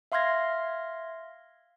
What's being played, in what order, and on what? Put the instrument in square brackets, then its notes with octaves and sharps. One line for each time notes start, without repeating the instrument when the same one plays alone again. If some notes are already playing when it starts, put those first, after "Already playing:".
[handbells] E5 F5 C6 F6 G#6 A#6